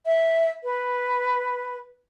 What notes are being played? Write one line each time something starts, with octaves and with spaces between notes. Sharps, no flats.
E5
B4